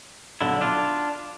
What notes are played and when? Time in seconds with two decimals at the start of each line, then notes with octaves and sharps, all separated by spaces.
0.41 B1 D3 E4
0.61 D4 F4